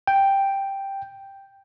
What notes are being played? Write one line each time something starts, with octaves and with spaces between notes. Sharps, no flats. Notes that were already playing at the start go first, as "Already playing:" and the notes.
G5